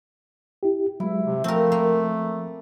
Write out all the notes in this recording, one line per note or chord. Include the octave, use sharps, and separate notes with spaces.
E4 G4
F#3 G#3 E4
C3
F3 A3 C4 A#4 F5 D6
A#3